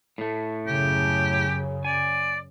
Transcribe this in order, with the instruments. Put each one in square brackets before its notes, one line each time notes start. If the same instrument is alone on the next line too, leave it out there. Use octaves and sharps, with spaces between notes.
[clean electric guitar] A2 A3
[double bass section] F#2 C#3 [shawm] G4
[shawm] D5 [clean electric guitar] G#5